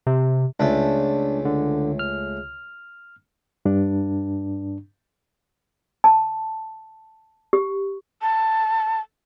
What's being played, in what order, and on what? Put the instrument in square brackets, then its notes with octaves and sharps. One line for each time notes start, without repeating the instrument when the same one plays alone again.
[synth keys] C3
[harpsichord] C#2 A3 [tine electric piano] D4
[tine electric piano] D3
F6
[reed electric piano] G2 D4
[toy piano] A5
G4
[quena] A5